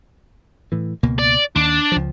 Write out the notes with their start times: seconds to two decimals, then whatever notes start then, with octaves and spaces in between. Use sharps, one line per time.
0.72 A2 E3
1.03 C#2 B2 A#3
1.19 D5
1.56 D#2 D4
1.92 C#2 F3